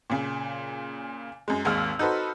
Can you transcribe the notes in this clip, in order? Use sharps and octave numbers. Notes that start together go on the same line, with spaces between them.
A#2 C#3
F#2 G#3
G#1 D#2 G#3 E6 F6
D#4 F#4 A4 B4 C5